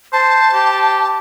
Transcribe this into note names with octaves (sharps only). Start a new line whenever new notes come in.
C5 A5
G4